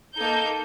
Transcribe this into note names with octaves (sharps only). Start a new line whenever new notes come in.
A#3 D#4 A4 G6